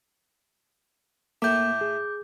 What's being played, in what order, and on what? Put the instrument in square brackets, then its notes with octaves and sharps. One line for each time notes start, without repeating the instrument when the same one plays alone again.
[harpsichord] A2 A3 [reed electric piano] A#3 [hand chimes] D6 G6
[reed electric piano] G#4